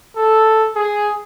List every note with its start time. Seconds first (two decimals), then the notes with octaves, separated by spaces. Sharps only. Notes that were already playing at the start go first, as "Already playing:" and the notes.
0.16 A4
0.76 G#4